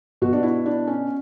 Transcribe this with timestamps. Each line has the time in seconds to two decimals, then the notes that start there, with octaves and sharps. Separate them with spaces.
0.22 B2 F#4
0.33 D4
0.43 E4
0.66 D4
0.87 C#4